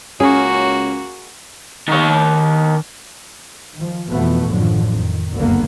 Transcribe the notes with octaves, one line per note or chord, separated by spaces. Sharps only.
C#2 A#3 C#4 F#4 G#4
D#3 C#5
D#3 F3
F2 B2 E3 F3 A3 B3
A1 F#2 D3 D#3 F3 F#3
F2 D#3
F#1 D2 G2 D3 A#3 B3